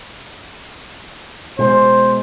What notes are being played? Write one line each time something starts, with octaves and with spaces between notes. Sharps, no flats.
B2 G#3 C5